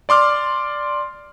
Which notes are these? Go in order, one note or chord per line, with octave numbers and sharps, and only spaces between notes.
D5 C6 D6 F6